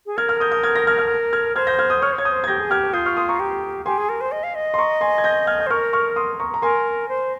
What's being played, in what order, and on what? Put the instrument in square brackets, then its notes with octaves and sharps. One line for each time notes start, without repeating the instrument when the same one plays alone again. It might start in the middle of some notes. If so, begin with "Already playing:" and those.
[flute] G#4
[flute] A#4 [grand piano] F6 G#6
[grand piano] F6 G#6
D#6 G6
D#6 G6
F6 G#6
G6 A#6
F6 G#6
F6 G#6
F6 G#6
[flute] C5 [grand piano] F6 G#6
[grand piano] G6 A#6
F6 G#6
D#6 G6
[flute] C#5 [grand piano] C#6 F6
[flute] C5
[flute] C#5 [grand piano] G#6
[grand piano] D#6 G6
[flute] C5
[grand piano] G#6
[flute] G4 [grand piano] G6 A#6
[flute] G#4
[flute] G4 [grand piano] F6 G#6
[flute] F4 [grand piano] D#6 G6
[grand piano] C#6 F6
C6 D#6
A#5 C#6
[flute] G4
[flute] G4 [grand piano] G#5 C6
[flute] G#4
A#4
C5
D#5
F5
D#5
[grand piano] C6
A#5 C#6
G#5 C6
G#6
G6 A#6
F6 G#6
G6
[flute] C5
[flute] A#4 [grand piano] C#6 F6
[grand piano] C#6 F6
C6 D#6
A#5 C#6
A#5
[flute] A#4 [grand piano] G#5 C6
[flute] C5